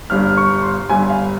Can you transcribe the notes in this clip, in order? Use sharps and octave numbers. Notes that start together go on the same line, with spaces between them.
G1 G2 G3 F6
C#6
C6
G1 G2 G3 G#5
F5